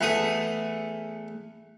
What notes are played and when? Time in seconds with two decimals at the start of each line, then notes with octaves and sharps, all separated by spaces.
0.01 E2 A3 D#6